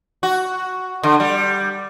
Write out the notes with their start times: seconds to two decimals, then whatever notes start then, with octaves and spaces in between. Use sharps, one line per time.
0.23 F#4
1.03 D3
1.20 G3